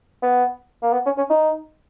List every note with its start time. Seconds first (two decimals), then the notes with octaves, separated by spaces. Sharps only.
0.23 B3
0.83 A#3
0.93 B3
1.06 C#4
1.18 C#4
1.30 D#4